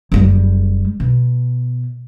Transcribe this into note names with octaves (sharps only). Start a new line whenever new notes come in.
F#1 G3
B2